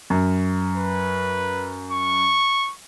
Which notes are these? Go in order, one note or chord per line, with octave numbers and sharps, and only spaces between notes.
F#2
B4
C#6